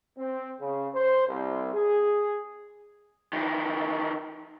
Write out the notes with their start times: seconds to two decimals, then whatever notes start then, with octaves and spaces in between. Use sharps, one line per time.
0.19 C4
0.60 C#3
0.95 C5
1.28 C2
1.74 G#4
3.33 D#3 E3